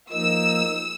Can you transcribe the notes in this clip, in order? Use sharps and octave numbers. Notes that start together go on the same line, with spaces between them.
F3 A#3 D#4 E6